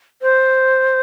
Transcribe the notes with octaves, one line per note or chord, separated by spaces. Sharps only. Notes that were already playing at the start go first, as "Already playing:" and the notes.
C5